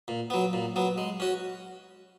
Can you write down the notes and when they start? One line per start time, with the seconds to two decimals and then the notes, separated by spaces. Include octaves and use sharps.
0.08 A#2
0.30 F#3 B3
0.53 A#2
0.76 F#3 B3
0.98 G#3
1.20 C#4 F#4